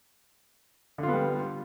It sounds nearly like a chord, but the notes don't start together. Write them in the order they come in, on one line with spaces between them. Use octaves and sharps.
D3 F4 B3 G3